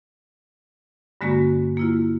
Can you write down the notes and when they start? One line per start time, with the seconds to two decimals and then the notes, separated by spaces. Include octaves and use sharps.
1.21 G2 D3 G#3 A#3 C#4 F#4
1.77 A#3 E4 F4